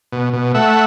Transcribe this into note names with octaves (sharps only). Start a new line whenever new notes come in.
B2
B2
A3 E5 F#5